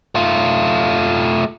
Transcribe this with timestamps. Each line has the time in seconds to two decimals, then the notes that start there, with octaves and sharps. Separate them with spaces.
0.15 A3 F4